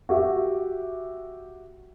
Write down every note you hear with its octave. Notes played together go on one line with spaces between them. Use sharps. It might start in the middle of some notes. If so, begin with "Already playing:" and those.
F#4 G4 E5